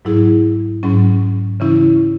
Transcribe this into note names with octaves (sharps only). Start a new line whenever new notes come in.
G#2 F#3 E4 G#4
G#2 F#3 C#4
C#3 E3 C#4 E4